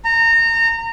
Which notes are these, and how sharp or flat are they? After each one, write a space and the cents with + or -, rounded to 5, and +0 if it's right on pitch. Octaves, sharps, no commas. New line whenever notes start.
A#5 -25